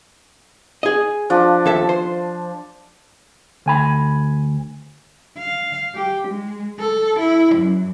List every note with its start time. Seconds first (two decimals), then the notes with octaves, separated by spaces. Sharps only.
0.83 G#4 D#5
1.30 F3 D4
1.66 D#2 A4 E5
1.89 C5
3.66 D2 G#5 B5
5.38 F5
5.95 G4
6.28 G#3
6.80 A4
7.20 E4
7.55 F#2